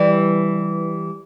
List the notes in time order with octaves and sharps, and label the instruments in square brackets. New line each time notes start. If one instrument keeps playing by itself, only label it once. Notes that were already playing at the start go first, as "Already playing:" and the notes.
Already playing: [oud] E3 G3